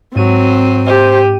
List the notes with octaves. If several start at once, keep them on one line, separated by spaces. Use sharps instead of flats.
G#2 F#3 C4 D#7
G4 C5